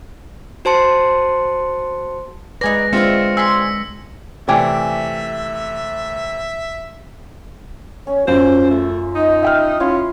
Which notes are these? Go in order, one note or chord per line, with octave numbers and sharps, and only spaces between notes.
F#4 C5 A5 C6 C#7
G#3 D#4 G#4 B4 D5 A#6
G#3 C4 D4 F4 B4 E5 C#6 C#7
G#4 C6 E6 B6
C3 E3 A3 D5 E5 G5 G#5
C#4 C#5
F#2 C#4 F4 C5
A3
D#4 D#5
E5 G5 F6
C#4 E4 F4 C6